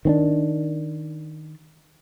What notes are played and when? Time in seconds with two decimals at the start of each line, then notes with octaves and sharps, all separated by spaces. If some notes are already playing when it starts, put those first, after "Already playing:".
0.05 D#3 C4 D4